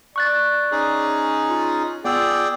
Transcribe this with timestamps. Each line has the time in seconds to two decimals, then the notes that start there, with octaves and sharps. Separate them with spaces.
0.16 D5 C#6 F#6 A6
0.72 C#4 D#4 G#4
1.49 F4
2.05 B3 F4 G#4 D5 G5 E6